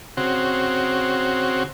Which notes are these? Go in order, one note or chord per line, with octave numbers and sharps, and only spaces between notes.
C#3 C4 F#4